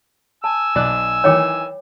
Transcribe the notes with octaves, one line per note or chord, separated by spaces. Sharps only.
G#5 A5 E6
B1 D5 F#6
D#3 E3 C#5 G5 D6